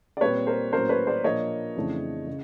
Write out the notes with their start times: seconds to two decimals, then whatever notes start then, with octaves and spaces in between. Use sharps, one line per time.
0.17 D5
0.21 A#2 G3 C4 B4 C#5
0.47 A#4 C5
0.72 A2 F#3 A#3 C#4 A#4 C5
0.89 B4 C#5
1.07 C5 D5
1.24 A#2 F3 A#3 D4 C#5 D#5
1.76 F2 C#3 E3 A3 D4
2.27 C#3